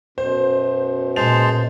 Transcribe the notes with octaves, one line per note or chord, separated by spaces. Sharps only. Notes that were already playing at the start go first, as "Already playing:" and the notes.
F#2 B2 C5
A#2 G#3 C5 A5 F7